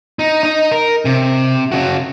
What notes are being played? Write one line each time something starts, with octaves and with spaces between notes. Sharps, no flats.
D#4
D#4 D#5
A#4
C3
C#3 F#4